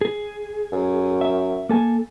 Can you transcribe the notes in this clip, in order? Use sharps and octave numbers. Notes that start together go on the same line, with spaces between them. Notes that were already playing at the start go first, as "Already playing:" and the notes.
G#4
F#2
E5
A#3 A4 G#5